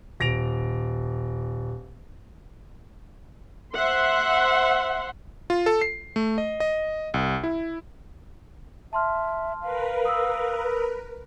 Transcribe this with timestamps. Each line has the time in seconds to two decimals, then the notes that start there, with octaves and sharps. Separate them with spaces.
0.20 D#1 A#6 D7 F7
3.74 C5 E5 F#5 C6
5.50 F4
5.66 A4
5.81 C7
6.16 A3
6.38 D#5
6.60 D#5
7.14 C2
7.44 E4
8.93 E5 A5 C6 F6
9.61 A#4 B4 F5
10.05 D#6 E6